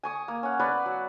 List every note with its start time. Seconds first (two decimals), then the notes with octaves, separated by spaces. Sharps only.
0.03 G#5 C#6 D#6
0.28 A#3
0.43 C#4 F#5
0.60 B3 B4 C#5 D5
0.86 F#3